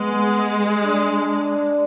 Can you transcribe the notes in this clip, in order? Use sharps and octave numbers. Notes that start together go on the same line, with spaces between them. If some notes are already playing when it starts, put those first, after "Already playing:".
Already playing: G#3 B3
D4